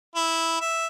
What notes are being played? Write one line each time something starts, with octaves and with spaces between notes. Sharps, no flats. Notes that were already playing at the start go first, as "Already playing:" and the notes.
E4
E5